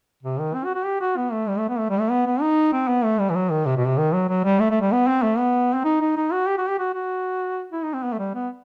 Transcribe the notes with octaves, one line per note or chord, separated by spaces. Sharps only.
C3
D#3
C4
F#4
F#4
G4
F#4
B3
A3
G3
A3
B3
A3
G3
A3
B3
B3
D#4
C4
B3
A3
G3
E3
F#3
D#3
C3
B2
C3
D#3
F#3
F#3
G3
A3
A3
G3
B3
C4
A3
B3
C4
D#4
D#4
D#4
F#4
G4
F#4
G4
F#4
F#4
E4
D#4
C4
B3
A3
G3
B3